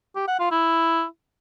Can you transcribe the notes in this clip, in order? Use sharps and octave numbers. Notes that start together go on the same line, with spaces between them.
G4
F#5
F4
E4